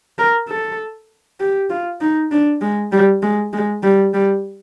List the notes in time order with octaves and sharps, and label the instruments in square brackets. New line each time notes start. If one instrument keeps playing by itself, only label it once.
[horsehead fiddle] A#4
A4
G4
F4
D#4
D4
G#3
G3
G#3
G#3
G3
G3